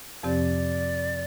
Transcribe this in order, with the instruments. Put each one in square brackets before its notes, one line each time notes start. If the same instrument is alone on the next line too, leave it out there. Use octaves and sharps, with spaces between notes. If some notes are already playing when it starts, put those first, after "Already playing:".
[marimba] F2 C3 F3 C4 G4 [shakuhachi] D5